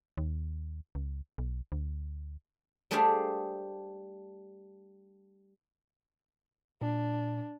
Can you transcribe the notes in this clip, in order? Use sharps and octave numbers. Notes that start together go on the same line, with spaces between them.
D#2
C#2
B1
D2
G3 A3 D4 G#4 C5 F5
A#2 D4